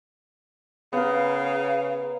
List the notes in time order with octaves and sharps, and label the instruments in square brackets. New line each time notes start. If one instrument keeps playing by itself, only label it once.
[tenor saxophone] C#3 [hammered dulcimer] B3 A#4 [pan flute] F5